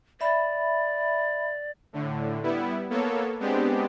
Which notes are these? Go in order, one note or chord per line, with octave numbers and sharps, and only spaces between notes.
D5 E5 B5
A2 D3
G3 B3 E4
A#3 B3 A4 C#5
G#3 B3 C4 D4 G4